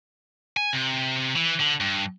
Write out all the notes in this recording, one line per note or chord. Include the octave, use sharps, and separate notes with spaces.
G#5
C3
E3
D3
G2